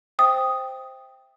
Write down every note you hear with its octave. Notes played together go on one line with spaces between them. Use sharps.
C5 E5 G5 D#6